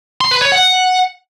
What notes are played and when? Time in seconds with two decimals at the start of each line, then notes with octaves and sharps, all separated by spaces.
0.21 C6
0.31 B4
0.42 C#5
0.52 F#5